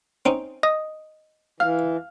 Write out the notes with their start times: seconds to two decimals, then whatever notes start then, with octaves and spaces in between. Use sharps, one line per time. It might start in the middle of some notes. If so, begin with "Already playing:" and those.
0.25 C4 C#4 D#4
0.63 D#5 D#6
1.60 E3 F5 F6